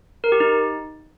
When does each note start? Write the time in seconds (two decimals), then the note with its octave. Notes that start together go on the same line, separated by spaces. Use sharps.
0.24 A#4
0.32 G4
0.40 D#4